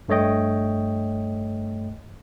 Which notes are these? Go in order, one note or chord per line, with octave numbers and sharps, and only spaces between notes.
G2 A3 C#5 D#5 G5